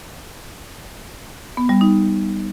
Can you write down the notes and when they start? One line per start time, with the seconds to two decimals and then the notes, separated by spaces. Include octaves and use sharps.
1.57 B3
1.69 G3
1.81 D#4